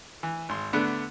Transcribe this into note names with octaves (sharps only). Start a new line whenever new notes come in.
E3
G#1 C6
D3 A3 B3 D4